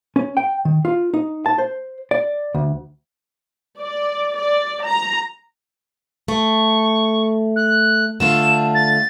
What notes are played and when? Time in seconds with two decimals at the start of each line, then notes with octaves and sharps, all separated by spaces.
0.16 C#4
0.37 G5
0.65 D#3
0.85 F4
1.14 D#4
1.46 A5
1.58 C5
2.11 D5
2.54 D2
3.79 D5
4.35 D5
4.85 A#5
6.28 A3 C#6
7.56 F#6
8.20 D3 A3 F4 E7
8.75 A6